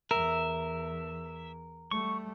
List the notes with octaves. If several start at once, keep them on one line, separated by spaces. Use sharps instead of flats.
E2 A#4 E5
G3 A3 C#6